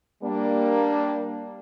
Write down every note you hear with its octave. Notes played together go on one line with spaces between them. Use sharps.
G3 A#3 D4